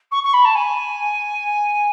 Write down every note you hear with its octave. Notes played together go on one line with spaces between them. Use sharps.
C#6
C#6
B5
A5
G#5